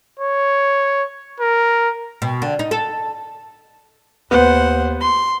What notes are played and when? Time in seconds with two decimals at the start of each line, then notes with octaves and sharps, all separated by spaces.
0.19 C#5
1.40 A#4
2.22 B2
2.42 D3
2.59 D#4
2.71 A4
4.31 D#2 B3 C5 F#5
5.01 C6